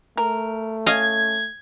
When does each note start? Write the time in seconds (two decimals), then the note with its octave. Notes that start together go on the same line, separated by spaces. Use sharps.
0.17 A3 A#4
0.86 C#4 D#5 F5 G#5 G#6